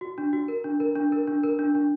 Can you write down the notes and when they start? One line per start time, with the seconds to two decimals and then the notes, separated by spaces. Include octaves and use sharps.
0.01 F#4
0.18 D4
0.33 F#4
0.48 A#4
0.64 D4
0.80 A#4
0.95 D4
1.12 A#4
1.27 D4
1.43 A#4
1.59 D4
1.75 D4